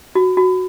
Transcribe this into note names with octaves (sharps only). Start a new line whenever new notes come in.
F#4
F#4